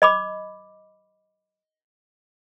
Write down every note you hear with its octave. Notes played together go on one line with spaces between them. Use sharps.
D#5 B5 D6